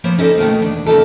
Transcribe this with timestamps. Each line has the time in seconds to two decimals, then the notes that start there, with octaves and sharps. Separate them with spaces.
0.04 F3 A#3 B3 C5 C#5
0.18 C#4 D#4 E4 A4 C5 D5
0.38 B2 D#3 A3 A#3
0.60 E2 D4
0.86 C#3 A#3 D#4 A4